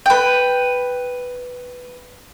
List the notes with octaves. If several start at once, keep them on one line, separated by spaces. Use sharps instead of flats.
B4 G5